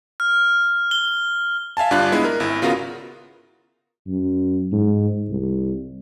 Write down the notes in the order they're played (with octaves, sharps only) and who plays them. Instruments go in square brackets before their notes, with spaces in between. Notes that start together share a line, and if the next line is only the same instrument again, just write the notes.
[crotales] F6
G7
[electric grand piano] E5 F5 G#5 A5
G1 G2 D4 F4 F5 F#6
G#3 B3 E4
A#4
G#1 E4
C#3 B3 F4 F#4 A#4
[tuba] F#2
G#2
C2